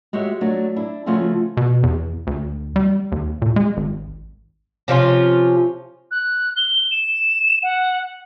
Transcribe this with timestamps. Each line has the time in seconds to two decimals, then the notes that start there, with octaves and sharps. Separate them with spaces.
0.13 G#3 F#4 G4 C#5 E5
0.41 F#3 A3 D4 F#4
0.76 D4 E4
1.06 C#3 F3 A3 F4 F#4 G#4
1.57 B2
1.83 E2
2.27 D2
2.76 G3
3.12 D#2
3.42 A#2
3.56 G#3
3.77 G#1
4.88 C3 F3 C#4 F4
6.11 F#6
6.56 G7
6.91 E7
7.62 F#5